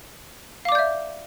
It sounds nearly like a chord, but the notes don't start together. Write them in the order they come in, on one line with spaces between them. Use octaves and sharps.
F5 D6 D5 G6 E5